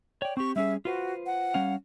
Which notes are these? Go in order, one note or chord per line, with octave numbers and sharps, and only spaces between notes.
C#5 D5 G5
C4 G4 C#6
G3 C#4 G#4 E5
F4 F#4 B4 C5
F#5
G3 C#4 F5